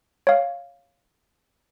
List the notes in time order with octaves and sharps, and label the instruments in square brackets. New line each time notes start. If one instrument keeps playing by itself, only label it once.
[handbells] C#5 F5